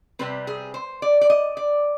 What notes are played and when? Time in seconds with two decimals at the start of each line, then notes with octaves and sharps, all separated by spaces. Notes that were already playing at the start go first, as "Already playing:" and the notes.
0.19 C3 G3 C4 B4
0.47 G#4
0.74 C5
1.02 D5
1.21 D5
1.30 D#5
1.57 D5